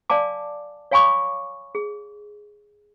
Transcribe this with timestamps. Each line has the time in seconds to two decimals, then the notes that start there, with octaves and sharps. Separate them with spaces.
0.10 D5 F5 G#5 A5 D6
0.91 C#5 F5 G#5 B5 C#6 D6
1.75 G#4